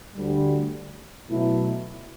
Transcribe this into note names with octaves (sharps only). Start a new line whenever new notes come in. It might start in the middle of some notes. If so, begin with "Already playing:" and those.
D2 D3 G3
B2 F#3 A3 E4